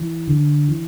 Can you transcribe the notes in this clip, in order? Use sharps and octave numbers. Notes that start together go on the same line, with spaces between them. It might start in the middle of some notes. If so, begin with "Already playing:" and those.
Already playing: E3
D3
E3